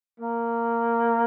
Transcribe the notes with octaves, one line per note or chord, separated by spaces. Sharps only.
A#3